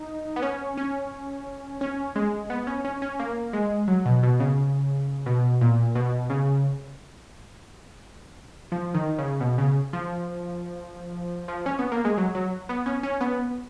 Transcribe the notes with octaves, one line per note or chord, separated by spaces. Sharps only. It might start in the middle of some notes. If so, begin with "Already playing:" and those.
Already playing: D#4
B3
C#4
C#4
C#4
G#3
B3
C#4
C#4
C#4
A#3
G#3
F#3
B2
B2
C#3
B2
A#2
B2
C#3
F3
D#3
C#3
B2
C#3
F3
F3
C#4
B3
A#3
G#3
F#3
F#3
B3
C#4
C#4
B3